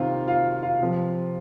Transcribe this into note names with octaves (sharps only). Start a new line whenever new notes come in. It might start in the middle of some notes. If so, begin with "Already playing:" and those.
Already playing: C3 D#3 C4 F4 F5
F4 F5
F4 F5
C3 F3 C4